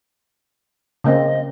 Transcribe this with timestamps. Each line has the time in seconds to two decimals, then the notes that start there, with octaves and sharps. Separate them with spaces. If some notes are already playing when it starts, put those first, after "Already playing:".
1.04 C#3 A#3 C4 D#5